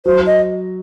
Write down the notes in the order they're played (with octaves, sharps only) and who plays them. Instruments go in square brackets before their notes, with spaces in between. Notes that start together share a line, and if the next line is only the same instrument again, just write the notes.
[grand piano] F#3 [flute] C5
[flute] D#5